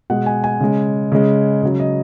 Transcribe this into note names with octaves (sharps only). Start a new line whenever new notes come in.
B2 G#3 F#5
G#5
G#5
C#3 G#3
C#3 G#3
C#3 F#3
D#5